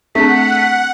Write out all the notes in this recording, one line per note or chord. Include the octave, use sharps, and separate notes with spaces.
A3 C4 D4 G#4 A4 F#5 B6